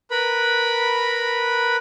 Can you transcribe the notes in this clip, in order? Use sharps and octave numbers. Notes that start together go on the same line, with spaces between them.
A#4 B4 B5